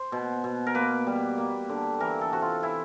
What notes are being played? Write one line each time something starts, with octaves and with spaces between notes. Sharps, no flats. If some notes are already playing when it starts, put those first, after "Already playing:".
Already playing: C5
B2
B2
A#4
A#3 B4
G3
A#3
D3
E3 A#4
A4
C3 F#4
F4
E3 E4